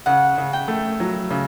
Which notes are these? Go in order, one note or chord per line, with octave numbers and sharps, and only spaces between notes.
C#3 F#5
C#3
G5
A3
F#3
C#3